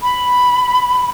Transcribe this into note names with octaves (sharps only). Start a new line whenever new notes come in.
B5